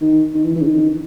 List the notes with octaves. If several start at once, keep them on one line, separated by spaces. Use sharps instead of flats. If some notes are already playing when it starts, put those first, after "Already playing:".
D#3
D#3
E3
E3
C#3
D#3